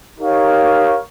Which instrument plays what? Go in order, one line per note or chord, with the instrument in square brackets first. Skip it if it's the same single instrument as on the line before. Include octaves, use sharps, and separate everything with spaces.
[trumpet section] D#4 G4 A#4 C#5 F5